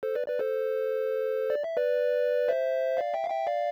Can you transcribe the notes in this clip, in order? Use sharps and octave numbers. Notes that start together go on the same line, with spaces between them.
A4 C5
B4 D5
B4 D5
A4 C5
D5
E5
B4 D5
C5 E5
D5 F5
E5 G5
F5
E5 G5
D5 F5